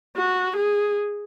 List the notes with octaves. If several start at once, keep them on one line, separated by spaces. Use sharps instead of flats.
F#4
G#4